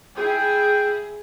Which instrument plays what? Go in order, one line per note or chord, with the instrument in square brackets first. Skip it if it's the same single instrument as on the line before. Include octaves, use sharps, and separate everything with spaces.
[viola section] E4 G#4 [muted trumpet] G5